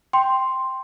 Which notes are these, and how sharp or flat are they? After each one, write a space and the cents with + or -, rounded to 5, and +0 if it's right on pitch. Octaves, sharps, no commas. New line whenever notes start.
G5 +0 C6 +0